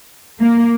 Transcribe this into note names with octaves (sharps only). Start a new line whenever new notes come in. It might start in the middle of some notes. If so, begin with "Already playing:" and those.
A#3